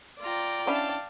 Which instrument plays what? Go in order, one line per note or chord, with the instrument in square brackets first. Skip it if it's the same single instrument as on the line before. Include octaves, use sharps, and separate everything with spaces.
[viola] F4 A#5 [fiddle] D5 G5
[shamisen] C#4 D4 E4 [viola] F5 A5